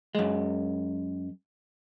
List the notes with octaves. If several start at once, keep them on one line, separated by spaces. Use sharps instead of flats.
F#2 G#3